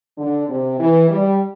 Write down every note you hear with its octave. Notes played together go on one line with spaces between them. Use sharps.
D3
C3
E3
G3